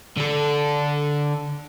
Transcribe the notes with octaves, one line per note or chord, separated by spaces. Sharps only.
D3 A4